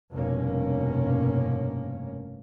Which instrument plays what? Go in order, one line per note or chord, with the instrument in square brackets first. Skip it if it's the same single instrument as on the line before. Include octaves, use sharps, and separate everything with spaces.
[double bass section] F1 G2 B2 A#3 C#4